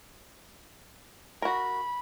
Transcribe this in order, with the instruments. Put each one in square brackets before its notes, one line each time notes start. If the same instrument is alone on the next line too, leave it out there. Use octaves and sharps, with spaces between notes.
[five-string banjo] F#4 A#4 [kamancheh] B5